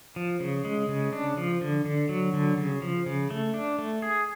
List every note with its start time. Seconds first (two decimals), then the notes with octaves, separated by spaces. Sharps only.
0.16 F3
0.40 C#3
0.65 G#3
0.89 C#3
1.13 D4
1.37 F3
1.61 D3
1.85 D3
2.09 F#3
2.33 D3
2.57 C#3
2.82 F3
3.06 C#3
3.30 A3
3.54 D4
3.79 A3
4.02 G#4